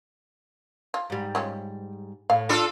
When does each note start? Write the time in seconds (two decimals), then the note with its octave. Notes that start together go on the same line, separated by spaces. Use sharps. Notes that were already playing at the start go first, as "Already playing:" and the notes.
0.94 F4
1.10 G#2 G3
1.35 F3 G#3 C#4
2.30 A2 F5
2.49 D4 F4 A4